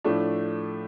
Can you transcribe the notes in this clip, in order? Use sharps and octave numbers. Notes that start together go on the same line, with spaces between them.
A2 F3 A3 D4